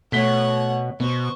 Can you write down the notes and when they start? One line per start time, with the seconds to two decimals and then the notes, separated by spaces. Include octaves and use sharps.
0.12 B2 A3 C#5 F#5 B6 G7
1.00 B2 B3 C5 C#6